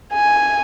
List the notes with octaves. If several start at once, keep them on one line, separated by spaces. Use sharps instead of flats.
G#5